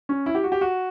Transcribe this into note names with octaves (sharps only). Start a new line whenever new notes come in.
C#4
E4
G4
F#4
G4
F#4